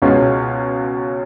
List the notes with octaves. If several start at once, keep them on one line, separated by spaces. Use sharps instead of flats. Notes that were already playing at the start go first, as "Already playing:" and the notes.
C#2 B2 G#3 C#4 F4